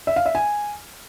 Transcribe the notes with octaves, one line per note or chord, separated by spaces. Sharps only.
E5
F5
E5
G#5